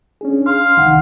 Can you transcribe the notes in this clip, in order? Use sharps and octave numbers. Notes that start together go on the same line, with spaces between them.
C#4 D4 G#4
F5 C6
C2 D#3 F#5